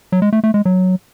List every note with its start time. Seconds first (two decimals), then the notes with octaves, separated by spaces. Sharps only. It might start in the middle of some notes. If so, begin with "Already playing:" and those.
0.12 F#3
0.22 G#3
0.33 A3
0.44 A3
0.54 G#3
0.65 F#3